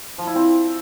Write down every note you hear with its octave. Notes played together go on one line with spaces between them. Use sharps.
F3
E4
C4